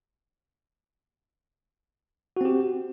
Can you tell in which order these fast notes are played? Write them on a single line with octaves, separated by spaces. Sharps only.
F#4 C4 G4